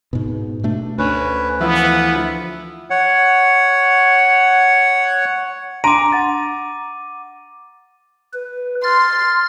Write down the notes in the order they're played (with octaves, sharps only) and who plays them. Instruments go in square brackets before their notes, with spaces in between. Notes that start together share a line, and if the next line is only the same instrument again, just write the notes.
[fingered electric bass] G#2 B2
B2 A3 D4
[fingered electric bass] D2 [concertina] C#4 B4
[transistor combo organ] E3 F3 [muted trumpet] B3 [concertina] E5
[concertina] C#5 F#5
[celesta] D4 C6 D7 [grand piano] A#5 [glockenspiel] D6 D#7
[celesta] F#5 A6
[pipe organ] B4
[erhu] C6 [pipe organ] F6 A6